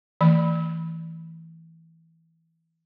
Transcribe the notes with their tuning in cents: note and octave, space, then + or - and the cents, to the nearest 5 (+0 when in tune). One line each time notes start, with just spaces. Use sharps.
E3 -10 A3 +30 B5 +0